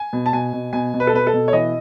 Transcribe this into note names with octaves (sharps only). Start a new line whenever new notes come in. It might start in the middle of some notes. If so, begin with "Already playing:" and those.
Already playing: G#5
B2
A5
B2 G#5
B2
B2 G#5
B2
B4
A4
B2 B4
A4
B2
C#5
E3 D#5